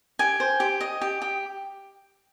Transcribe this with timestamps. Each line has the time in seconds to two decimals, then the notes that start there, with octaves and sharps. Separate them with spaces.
0.19 G4 G#5
0.40 C5
0.60 G4
0.81 D#5
1.02 G4
1.22 G4